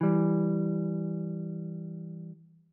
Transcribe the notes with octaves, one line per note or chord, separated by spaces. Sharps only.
E3 G3